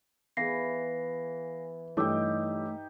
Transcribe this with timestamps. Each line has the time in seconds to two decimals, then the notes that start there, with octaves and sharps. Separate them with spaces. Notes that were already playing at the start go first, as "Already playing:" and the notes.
0.37 E3 B3 G#4 F5 A#6 C7
1.97 G2 E3 A3 D#4 G4 C#5 D6 E6